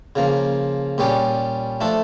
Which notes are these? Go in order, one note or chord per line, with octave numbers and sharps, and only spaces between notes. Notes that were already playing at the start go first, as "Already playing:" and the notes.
C#3 F3 A#3
A#2 G3 C#4 G4
F3 A3 D4 A4